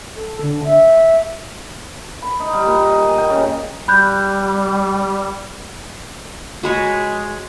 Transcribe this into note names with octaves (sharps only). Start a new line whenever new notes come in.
A4
D3
E5
B5
D#4
G3
A#2
D#5
G#5
G5
C#3
G3 B5 F#6 G6
G#3 F#4 B4 C#5